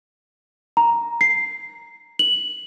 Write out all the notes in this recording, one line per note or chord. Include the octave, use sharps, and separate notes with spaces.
A#5
C7
F#7